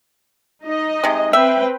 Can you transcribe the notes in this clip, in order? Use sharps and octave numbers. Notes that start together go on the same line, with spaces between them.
D#4 D#5
C3 G#3
C4 B4 E5 G5